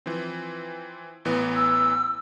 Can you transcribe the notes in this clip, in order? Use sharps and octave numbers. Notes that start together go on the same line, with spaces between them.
E3 F3 C4
A1 E3 B3
E6